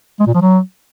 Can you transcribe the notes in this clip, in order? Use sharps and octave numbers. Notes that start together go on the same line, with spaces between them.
G#3
A#2
F3
F#3